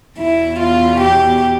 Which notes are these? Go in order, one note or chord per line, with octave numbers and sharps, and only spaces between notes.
E2 B2 E4
F4
G4